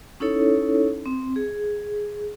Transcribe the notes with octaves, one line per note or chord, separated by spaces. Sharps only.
C#4 D#4 E4 A4 C#5
C4
G#4